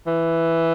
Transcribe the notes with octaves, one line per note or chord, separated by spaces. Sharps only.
E3